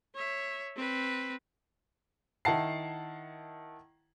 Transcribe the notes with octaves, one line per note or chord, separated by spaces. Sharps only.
C#5 E5
C4 B4
D#3 E4 F#5 A5 C7